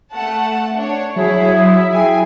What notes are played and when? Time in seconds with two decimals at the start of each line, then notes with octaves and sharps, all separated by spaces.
0.12 A3 F#5 A5
0.76 D4 C#5
1.16 F#3 E4 G#4 C#5 E5
1.57 E5 D#6
1.92 E4 G#4 G5 G#5